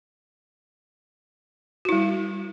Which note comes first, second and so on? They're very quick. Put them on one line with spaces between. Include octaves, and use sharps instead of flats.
F#4 E4 G3